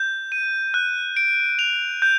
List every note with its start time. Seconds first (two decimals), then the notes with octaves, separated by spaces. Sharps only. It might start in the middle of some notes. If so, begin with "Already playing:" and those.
Already playing: G6
0.32 D#7
0.74 F#6
1.17 D7
1.59 F7
2.02 G6